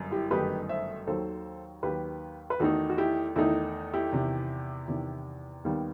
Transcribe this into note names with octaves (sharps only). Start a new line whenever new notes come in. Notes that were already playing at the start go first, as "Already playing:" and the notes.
Already playing: G1 F#2
E4 G4
G1 F#2 D#3 A3 D#4 G4 B4
C5 E5
D#2 D#3 F#3 A4 C5
D#2 D#3 F#3 G4 B4
B4
E2 D#3 A3 D#4 F#4 A4
F#4
E4 G4
E2 D#3 A3 D#4 E4
E4 G4
E2 C3 D#3
E2 C3 D#3
D#2 D#3 G3 B3